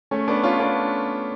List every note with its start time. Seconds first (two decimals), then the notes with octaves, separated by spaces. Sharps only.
0.11 A3 C#4
0.28 B3 D4
0.43 C#4 F4
0.60 B3 D4